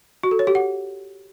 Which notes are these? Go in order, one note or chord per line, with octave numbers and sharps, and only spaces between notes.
F#4
A4
C#5
G4
F#5